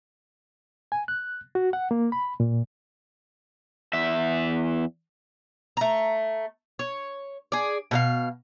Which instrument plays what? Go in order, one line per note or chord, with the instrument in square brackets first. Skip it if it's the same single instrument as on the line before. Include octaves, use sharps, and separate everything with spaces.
[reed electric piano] G#5
F#6
F#4
F#5
A#3
B5
A#2
[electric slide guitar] E2 E5
[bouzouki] A3 A#5
C#5
G#4 D5
B2 A4 F5